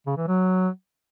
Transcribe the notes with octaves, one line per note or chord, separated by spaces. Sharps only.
C#3
E3
F#3